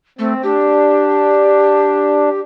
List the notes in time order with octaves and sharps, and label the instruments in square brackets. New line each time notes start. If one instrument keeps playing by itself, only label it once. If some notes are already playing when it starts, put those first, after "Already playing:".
[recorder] A3 [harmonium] C4
[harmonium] D4 [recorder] G4